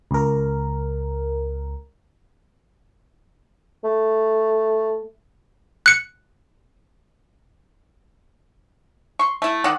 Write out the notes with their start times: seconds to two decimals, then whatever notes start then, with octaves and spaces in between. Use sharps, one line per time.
0.11 C#2 A#4
3.84 A3
5.86 F#6 C#7
9.19 C6 C#6
9.42 A3 E4
9.64 D#3 D5 F#5